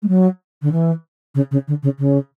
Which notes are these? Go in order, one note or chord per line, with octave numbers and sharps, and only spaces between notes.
G#3
F#3
D3
E3
C#3
C#3
D3
C#3
C#3